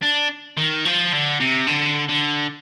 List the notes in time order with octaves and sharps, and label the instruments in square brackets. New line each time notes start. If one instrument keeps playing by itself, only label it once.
[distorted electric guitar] D4
D#3
F3
D3
C3
D3
D3